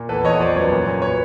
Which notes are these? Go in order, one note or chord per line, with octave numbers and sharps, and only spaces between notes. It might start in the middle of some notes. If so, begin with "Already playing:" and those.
Already playing: A#2
E2 A4 B4
E2 C#5 D#5
F3 C5 D5
F#2 B4 C#5
A#2
A#2
B4 C#5